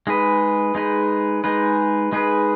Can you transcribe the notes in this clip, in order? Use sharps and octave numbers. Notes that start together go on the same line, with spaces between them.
G#3 D#4 G#4 B4
G#3 D#4 G#4 B4
G#3 D#4 G#4 B4
G#3 D#4 G#4 B4